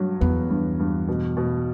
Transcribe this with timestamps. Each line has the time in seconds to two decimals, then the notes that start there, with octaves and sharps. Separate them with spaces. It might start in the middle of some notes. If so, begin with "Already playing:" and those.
Already playing: G2 F#3
0.21 E2 B3
0.50 G2
0.79 G2
1.08 B2
1.37 B2